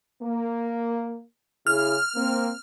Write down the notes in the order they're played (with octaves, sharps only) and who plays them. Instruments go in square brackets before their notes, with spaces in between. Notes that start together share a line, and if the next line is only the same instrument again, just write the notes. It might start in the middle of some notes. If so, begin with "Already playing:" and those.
[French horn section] A#3
[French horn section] C#3 E4 G#4 [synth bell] F6
[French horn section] A#3 C4